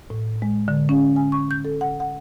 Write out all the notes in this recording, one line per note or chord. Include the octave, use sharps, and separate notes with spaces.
A2
G#3
D3
C#4
G#5
C#6
G6
A4
F#5
F#5